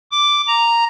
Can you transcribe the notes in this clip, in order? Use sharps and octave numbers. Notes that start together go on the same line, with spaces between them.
D6
A#5